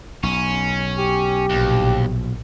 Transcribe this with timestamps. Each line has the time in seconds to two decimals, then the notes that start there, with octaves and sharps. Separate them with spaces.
0.23 B1 C#4
0.98 G4
1.50 A#1 D#2 B2